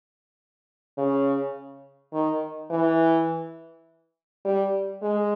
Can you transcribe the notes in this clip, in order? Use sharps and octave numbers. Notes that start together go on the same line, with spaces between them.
C#3
D#3
E3
G3
G#3